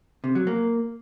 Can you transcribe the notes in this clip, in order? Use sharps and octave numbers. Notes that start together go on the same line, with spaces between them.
C3
F#3
A#3